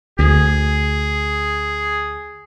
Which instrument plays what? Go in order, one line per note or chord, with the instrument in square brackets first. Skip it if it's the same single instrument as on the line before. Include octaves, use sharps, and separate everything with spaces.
[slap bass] D2 [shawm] G#4